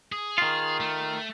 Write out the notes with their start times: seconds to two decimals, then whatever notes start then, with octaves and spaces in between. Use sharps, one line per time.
0.12 G#4
0.38 D#3 F4
0.80 A3